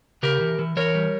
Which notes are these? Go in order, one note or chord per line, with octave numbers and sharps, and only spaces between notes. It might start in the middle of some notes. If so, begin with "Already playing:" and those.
C#3 G4 A#4
E3
E3
E3 A#4 C#5
G3